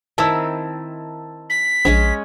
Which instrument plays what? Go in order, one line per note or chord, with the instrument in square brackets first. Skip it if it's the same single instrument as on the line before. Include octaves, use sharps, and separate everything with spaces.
[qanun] D#3 C4 E4 [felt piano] A5 E6
[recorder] B6
[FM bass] A#1 [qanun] G#3 C#4 G#4